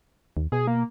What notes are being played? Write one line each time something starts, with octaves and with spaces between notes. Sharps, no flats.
D#2
B2 G#4
A#3